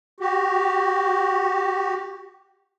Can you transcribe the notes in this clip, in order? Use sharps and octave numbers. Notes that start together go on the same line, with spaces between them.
F#4 G4